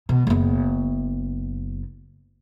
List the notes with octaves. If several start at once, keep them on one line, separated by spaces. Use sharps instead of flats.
B2
F#1 B3